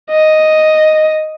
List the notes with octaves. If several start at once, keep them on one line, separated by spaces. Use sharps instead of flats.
D#5